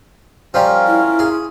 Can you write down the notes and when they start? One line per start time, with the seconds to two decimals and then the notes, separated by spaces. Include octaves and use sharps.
0.54 F3 G3 C#4 F4 A#4
0.87 E4
1.19 G#4